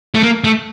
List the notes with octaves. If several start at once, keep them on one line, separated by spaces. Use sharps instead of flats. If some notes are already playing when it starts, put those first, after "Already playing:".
A3
A#3
A3